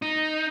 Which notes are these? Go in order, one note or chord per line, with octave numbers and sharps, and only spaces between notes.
D#4